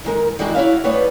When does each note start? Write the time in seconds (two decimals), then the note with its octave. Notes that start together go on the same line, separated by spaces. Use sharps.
0.05 D#3 G#3 A#4
0.39 D#3 G3 G#3 E4 F#4
0.55 E4 F#4 C#5 E5 F5
0.84 G3 A3 B3 C4 B4 C#5